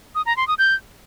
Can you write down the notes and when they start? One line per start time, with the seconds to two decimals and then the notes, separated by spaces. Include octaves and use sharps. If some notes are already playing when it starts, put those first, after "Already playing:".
0.15 D#6
0.26 A#5
0.37 C6
0.48 D#6
0.59 G6